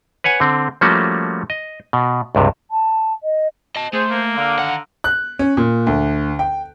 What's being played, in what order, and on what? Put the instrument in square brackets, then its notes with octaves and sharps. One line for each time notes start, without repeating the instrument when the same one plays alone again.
[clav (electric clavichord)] B4 C#5 F#5 G#5
D3 C4
F3 G3 A3 A#3 C#4 F#4
D#5
B2
C#2 G2 C3
[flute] A5
D#5
[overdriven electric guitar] D#5 A5
[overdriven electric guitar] A3 [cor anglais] G#4 [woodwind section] C5
[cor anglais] A#3
[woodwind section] D3 F5 A#5
[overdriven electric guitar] D#3 F#5
[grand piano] F#6
C#4
A#2
D2
G5